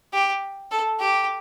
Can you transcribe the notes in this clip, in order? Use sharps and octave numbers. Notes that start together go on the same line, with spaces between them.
G4
A4
G4